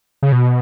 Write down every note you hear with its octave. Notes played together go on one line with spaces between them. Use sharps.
C#3
B2